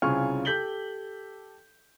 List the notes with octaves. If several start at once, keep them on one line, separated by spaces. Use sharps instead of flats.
C2 C#3 F4 G#5 C#6 F6
G4 A4 G6 B6 F#7 G7